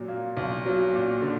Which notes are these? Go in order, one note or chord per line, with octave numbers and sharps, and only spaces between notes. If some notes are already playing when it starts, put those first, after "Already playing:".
Already playing: A#2 F#3
A#3
B1
F#3
A#2
D3